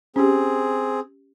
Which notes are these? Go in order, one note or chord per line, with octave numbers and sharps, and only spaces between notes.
C4 C#4 G4 G#4